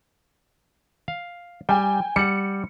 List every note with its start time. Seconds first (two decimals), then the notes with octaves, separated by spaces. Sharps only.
1.08 F5
1.69 G3 G5 G#5
2.16 G3 F#5 C#7